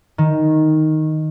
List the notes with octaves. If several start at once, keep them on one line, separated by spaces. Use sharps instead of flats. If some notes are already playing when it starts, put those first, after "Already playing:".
D#3